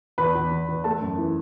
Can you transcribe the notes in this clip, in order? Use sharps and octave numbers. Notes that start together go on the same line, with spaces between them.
E2 B4 B5
E2
E2
E2
A3 A4 A5
F#2
E3